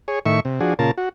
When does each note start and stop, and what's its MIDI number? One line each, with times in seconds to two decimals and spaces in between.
0.08 0.19 68
0.08 0.19 73
0.26 0.40 45
0.26 0.40 51
0.26 0.40 76
0.26 0.40 85
0.45 0.60 48
0.60 0.74 53
0.60 0.74 62
0.60 0.74 66
0.60 0.74 68
0.79 0.91 46
0.79 0.91 49
0.79 0.91 65
0.79 0.91 70
0.79 0.91 81
0.97 1.09 66